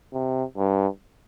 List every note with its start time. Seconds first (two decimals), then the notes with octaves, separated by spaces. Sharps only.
0.13 C3
0.57 G2